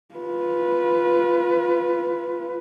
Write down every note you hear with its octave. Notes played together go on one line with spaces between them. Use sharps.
F4 B4